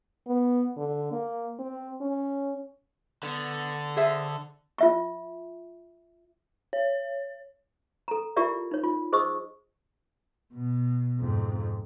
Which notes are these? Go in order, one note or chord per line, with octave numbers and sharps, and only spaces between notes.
B3
D3
A#3
C4
C#4
D3 B3
G#4 C5 E5
F4 E5 C#6
C#5
A4 A#5
E4 F4 G4 A#4 D5 E5
D#4 C#5
F4
G#4 C5 D#5 C#6 D#6 E6
B2
F2 G#2